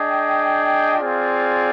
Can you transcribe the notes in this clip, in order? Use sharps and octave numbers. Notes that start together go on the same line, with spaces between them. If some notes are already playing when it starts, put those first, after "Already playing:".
Already playing: D4 G#4 D#5 G5
C4 F4 G#4 D5 F5